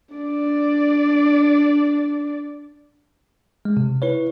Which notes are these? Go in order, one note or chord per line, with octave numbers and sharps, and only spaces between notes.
D4 D5
G#3
C3
E4 B4 C#5